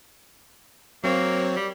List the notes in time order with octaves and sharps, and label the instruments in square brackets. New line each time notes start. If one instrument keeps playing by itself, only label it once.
[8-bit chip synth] F#3 C4 C#5 [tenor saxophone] A#3
[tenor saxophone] G3